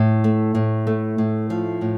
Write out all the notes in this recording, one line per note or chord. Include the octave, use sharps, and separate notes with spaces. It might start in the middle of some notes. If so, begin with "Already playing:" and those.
Already playing: A2
A3
A2
A3
A2
F3
A2